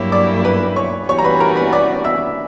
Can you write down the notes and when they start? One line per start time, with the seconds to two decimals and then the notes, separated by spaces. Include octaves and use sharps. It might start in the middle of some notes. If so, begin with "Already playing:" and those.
Already playing: G2 F#3 A#3 E4 G4 C#5
0.12 D5 D6
0.45 B4 B5
0.76 C#5 C#6
1.08 E3 G3 C#4 F#4 C#5 C#6
1.19 A#5
1.24 B4 B5
1.40 A#4 A#5
1.56 B4 B5
1.73 D5 D6
2.04 E5 E6